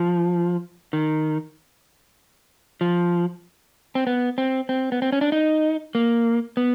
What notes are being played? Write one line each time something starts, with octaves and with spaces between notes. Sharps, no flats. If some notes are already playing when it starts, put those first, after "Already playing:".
Already playing: F3
D#3
F3
C4
B3
C4
C4
B3
C4
C#4
D4
D#4
A#3
B3